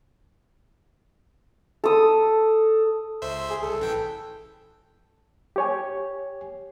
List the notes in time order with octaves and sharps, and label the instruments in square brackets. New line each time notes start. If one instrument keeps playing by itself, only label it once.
[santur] A4 D#6
[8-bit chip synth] C#2 C5 E5
[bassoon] G#4
[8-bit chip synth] C2 [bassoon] A4
[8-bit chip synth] A1 E3 G5
[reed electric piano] G4 C#5 G#5